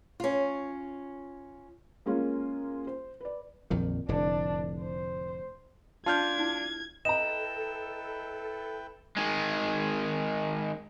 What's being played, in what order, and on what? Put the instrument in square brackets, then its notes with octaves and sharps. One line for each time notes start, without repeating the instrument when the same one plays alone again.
[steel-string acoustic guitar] C#4 F4
[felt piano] G#3 A#3 C#4 F4
C5
B4 D5
[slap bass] A#1 F2 D#3
[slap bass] F1 A2 D3 [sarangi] D4
[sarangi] C5
[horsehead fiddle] D4 [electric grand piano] F4 F6 G6 [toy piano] A5 [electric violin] G#6
[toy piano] E4
[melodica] E4 B4 G5 [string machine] A4 [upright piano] D#5 A#5 [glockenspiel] E7
[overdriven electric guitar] D#3 G#3